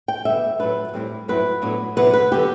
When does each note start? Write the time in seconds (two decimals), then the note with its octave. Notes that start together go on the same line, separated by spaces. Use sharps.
0.08 G5
0.25 D3 G3 B3 E5
0.59 A2 F#3 A3 D4 B4
0.94 A2 G3 C4 E4
1.28 G2 F#3 C4 E4 B4
1.62 A2 F#3 B3 D4
1.97 C3 F#3 B3 E4 B4
2.13 B4
2.31 D3 F#3 B3 G4